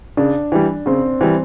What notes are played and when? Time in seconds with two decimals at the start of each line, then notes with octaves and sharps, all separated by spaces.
0.17 C#3 D4
0.52 E3 G3
0.86 C#3 C4
1.21 E3 G3